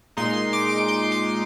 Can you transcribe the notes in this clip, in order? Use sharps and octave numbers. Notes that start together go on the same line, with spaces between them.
A#2 G#3 D#4 C6
D6
C6
D6